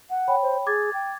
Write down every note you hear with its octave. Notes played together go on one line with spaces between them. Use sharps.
F#5
C#5 G5 B5
C5
G#4 D6 G#6 A6
G5